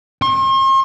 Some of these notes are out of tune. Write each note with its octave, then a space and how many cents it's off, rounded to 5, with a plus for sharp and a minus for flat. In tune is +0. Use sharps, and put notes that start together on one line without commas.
C6 +45